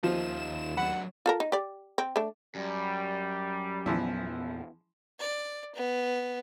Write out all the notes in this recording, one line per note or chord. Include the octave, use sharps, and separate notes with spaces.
D#2 F3 D#4 F4 E7
F#3 D4 F#5 B5
F4 A4 A#4
D#4
G4 D5
C4
A3 D4
F#2 G3
E2 A#2 E3 F3 B3 E4
D5
B3